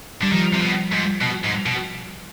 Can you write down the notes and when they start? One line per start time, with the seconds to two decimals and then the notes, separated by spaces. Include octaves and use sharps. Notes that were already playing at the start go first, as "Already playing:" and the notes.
0.22 D3 G3
0.32 D#3 F3
0.54 C3
0.61 B2
0.92 G#2
1.22 B2
1.44 G#2
1.66 B2